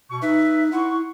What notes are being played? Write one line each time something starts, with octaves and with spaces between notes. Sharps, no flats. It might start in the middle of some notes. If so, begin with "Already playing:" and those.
B2 C#6
D#4 B4 E5
E4 F#5 C6 C#6